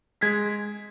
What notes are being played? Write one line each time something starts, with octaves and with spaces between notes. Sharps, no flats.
G#3 G#6 B6